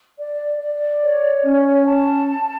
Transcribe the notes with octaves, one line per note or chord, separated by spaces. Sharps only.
D5
D5
C#5
C#4
A5